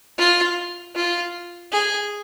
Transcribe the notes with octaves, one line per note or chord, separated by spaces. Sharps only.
F4
F4
G#4